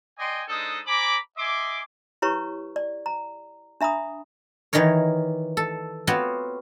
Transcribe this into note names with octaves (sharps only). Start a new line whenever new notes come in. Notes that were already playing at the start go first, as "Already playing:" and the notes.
D5 D#5 G5 G#5 C6
G#3 D4 D#4 A4 C5 D#6
C5 G#5 A#5 B5 D6
D#5 E5 G#5 C6 D6
E4 G4 B4 C#5 A#5 C#6
D5
A#5
D4 E5 A#5 B5 D#6
D#3 E3 D#4 A#4 C#5
A4
B3 C4 F4 F#4 C#5